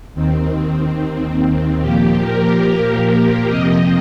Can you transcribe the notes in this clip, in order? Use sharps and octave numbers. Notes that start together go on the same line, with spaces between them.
D#2 D#3 C4
A#2 F3 A#3 G4
A#4
G4
A#4
F2 C3 F3 C4 D#5